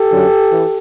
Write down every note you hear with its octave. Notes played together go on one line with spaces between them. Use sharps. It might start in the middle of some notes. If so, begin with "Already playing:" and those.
Already playing: G4 A4
F#2 D3 F#3
E3